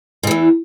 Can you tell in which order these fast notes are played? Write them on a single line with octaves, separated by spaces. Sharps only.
G#2 E3 E2